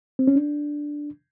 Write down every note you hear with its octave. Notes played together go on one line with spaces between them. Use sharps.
C4
C#4
D4